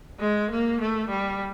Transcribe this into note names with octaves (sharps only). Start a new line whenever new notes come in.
G#3
A#3
A3
G3